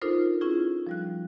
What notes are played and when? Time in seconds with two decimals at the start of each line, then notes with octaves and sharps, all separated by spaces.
0.02 D4 D#4 F4 A4 A#4 C5
0.41 C#4 E4 F4 G#4
0.87 F3 G3 F#6